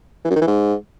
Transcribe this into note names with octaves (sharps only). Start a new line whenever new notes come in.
E3
F#2
D#3
E3
G#2